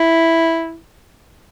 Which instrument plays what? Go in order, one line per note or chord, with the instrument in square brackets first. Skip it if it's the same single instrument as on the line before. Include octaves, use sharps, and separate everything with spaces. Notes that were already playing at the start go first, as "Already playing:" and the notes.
Already playing: [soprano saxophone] E4